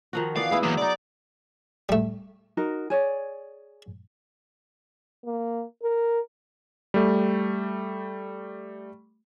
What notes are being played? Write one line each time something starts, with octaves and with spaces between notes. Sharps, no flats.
D#3 F3 F#4
E3 B3 D5 F5
B3 E4 G#4
E3 F#3 A#3
B3 D#4 D5
G3 A3
D#4 F#4 A#4
G#4 C#5 D5
A#3
A#4
G3 A3